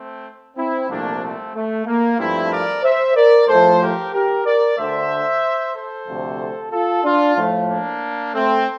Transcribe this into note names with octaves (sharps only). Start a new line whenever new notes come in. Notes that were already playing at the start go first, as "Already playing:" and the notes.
Already playing: A3 C4
C4 E4
C2 A#2 F3 A3 A#3 D4
A3 C4
A3
A#3
G2 F3 A3 C4 E4
A#4 D5
C5 E5
A#4 D5
A2 F3 A3 A4 C5
G4 A#4
G4 A#4
A#4 D5
D2 D3 A3 C5 E5
A4 C5
D2 C3 F3
F4 A4
D4 F4
A2 F3 A3
A#3 D4
A3 C4